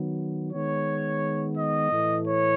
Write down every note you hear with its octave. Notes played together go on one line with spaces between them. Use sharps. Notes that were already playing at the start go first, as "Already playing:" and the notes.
Already playing: D#3 F#3 B3
D#3 G#3 B3 C#5
D#5
A2 E3 A3
C#5